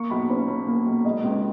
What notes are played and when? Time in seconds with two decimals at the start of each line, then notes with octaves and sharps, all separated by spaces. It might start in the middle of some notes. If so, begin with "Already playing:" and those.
Already playing: A#3 C#6
0.10 B1 B5
0.30 C#4 B5
0.48 A#2 B5
0.67 A#3
0.86 B1
1.04 G#3 D#5
1.24 C#2